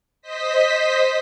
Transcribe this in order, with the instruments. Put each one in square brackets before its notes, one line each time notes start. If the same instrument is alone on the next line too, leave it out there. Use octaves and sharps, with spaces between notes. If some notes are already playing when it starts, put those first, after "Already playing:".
[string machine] C5 D#5 B6